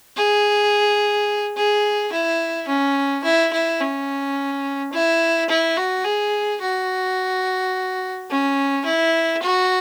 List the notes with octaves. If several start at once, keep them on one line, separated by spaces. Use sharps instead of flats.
G#4
G#4
E4
C#4
E4
E4
C#4
E4
E4
F#4
G#4
F#4
C#4
E4
F#4